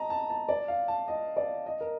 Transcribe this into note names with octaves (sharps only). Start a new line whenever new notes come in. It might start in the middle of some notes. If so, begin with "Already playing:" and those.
Already playing: D#5 A5 A#5
A5
A5
D5
F5
A5
D#5
D5
D#5
A#4